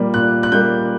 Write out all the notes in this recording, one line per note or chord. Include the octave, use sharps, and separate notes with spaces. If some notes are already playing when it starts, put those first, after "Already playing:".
Already playing: A#2 G3 A#3
A#2 F#6
F#6
G3 A#3 G6